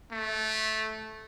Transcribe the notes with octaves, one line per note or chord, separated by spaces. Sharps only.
A3